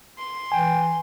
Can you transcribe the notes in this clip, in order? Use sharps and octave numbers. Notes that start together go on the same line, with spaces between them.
C6
E3 G5 G#5